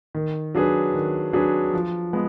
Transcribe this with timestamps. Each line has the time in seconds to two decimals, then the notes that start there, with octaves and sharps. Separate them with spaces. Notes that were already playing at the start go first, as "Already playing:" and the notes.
0.15 D#3
0.55 F#3 D4 G#4 B4
0.94 D#3
1.33 F#3 D4 G#4 B4
1.73 F3
2.13 G#3 B3